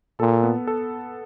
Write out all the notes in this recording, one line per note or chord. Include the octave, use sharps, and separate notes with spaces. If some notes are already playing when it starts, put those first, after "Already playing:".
A#2 A4
B3
A4